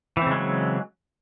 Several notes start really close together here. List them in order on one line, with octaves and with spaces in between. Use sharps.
E3 C4 C#3 G#3 F#3